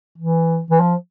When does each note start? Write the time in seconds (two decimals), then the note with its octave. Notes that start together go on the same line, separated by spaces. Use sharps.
0.18 E3
0.70 E3
0.80 F3